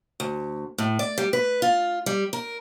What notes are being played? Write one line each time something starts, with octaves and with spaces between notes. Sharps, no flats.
D2
A2
D5
G3
B4
F4
G3
A#4